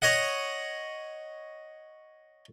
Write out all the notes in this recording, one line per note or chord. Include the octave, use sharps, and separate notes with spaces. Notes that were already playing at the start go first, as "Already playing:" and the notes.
C#5 D#5 F#5